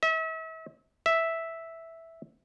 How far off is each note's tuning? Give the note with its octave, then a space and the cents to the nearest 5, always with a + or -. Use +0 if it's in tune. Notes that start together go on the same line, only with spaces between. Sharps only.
E5 -40
E5 -5